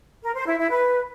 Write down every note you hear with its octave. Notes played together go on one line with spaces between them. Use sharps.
A#4
C5
E4
E4
B4